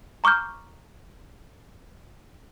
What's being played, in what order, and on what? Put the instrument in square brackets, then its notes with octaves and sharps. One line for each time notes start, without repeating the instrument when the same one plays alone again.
[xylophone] A#5 C#6 D6 F6 G6